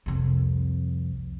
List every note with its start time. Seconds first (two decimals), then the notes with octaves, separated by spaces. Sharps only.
0.06 C2 F2